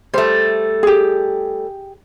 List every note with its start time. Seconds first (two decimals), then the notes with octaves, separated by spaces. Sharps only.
0.14 G3 A3 C5
0.83 G4 G#4